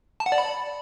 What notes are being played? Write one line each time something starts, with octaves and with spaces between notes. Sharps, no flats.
A5
F#5
D5
B5